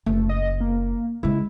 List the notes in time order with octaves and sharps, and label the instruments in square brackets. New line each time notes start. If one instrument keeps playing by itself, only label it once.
[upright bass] F#1 [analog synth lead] A3
[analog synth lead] D#5
A#3
[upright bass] C#3 G#3 [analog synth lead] E4